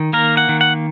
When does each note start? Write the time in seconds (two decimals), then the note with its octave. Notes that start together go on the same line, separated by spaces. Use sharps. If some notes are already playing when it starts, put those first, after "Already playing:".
Already playing: D#3
0.13 A#3 A#4
0.37 F#5
0.49 D#3
0.61 F#5